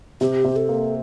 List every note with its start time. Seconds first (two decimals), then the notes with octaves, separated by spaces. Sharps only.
0.21 C3 G4
0.44 C3
0.56 A4
0.69 A#3